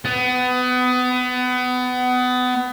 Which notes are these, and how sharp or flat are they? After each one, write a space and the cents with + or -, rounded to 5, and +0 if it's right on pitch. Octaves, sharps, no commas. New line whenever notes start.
B3 +25